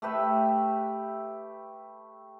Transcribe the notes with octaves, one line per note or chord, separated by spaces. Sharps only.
A3 G4 B4 E5